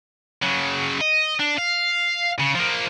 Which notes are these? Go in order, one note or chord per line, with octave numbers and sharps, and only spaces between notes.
C#3 F#3
D#5
D4
F5
C#3
F3 A#3